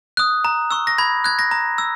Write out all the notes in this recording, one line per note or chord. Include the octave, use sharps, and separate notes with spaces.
D#6 F#6
A#5
C#6 E6
A#6
B5 G#6
F#6 G#6
A#6
A#5
E6